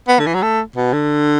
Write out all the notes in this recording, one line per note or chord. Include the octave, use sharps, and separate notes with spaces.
B3
D3
E3
F#3
A3
B2
D3